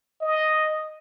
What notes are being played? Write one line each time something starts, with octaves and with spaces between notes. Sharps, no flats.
D#5